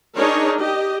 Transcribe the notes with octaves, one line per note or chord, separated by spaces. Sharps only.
D4 D#4 G#4 A#4 C#5
G4 D#5